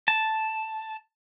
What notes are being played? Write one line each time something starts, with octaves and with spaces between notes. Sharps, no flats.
A5